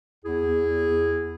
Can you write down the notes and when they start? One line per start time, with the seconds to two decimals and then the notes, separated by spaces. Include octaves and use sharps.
0.23 E2 E4 G#4
0.45 E2
0.66 E2
0.86 E2
1.07 E2